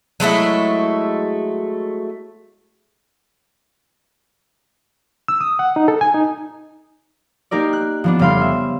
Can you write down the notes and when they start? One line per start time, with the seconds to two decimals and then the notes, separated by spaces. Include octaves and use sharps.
0.20 F#3 G#3 A3 E4
5.28 E6
5.41 D#6
5.59 F#5
5.76 D#4
5.88 A4
6.01 G#5
6.14 D#4
7.51 A#3 D#4 G4 A#4 D5
7.73 F#6
8.04 F3 B3 D4
8.19 F1 C#3 G3 F5 B5 C6
8.41 E5